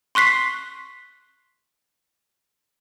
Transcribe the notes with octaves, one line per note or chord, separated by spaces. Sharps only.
C6 C#6 F#6 B6 C7